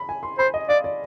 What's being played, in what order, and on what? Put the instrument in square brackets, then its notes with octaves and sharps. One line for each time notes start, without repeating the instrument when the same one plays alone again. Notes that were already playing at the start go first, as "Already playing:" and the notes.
Already playing: [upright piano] B5
G#5
C6
[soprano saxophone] C5 [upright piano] B5
[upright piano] D#5
[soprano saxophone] D5 [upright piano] F5
[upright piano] D5